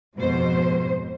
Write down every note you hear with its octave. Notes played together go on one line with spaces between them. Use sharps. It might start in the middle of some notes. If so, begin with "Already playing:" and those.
F2 G#2 B2 G#3 C5